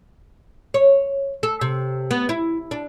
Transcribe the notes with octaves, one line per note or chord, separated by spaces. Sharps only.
C#5
A4
C3
B3
E4
D4